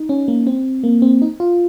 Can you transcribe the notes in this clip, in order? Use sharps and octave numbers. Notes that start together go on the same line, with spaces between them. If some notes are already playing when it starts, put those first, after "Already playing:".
Already playing: D#4
C#4
A#3
C4
A#3
C4
D#4
F4